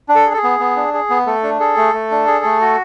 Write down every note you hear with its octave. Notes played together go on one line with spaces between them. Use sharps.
D4
A4
G#4
A4
G#4
B3
B3
D4
G#4
B3
A3 A4
D4
G#4 A4
A3
A3
D4
G#4
A3
F#4